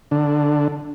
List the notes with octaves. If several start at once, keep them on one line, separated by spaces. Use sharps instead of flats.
D3